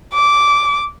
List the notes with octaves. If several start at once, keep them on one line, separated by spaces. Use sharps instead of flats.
D6